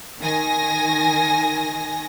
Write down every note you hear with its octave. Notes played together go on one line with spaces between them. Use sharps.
D#3 G#5 A#6